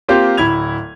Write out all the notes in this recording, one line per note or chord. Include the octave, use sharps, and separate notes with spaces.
A#3 C4 F4 G4 C5
D1 E4 B5 G#6 F7